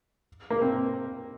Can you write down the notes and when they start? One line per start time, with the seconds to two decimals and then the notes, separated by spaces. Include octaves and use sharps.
0.50 A#3
0.62 C4